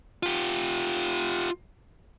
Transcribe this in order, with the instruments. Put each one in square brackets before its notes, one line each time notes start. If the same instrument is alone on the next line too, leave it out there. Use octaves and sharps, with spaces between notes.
[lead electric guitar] F4 G4